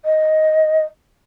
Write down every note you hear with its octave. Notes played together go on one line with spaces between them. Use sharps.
D#5